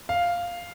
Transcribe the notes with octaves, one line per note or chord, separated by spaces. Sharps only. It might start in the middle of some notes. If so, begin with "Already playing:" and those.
F5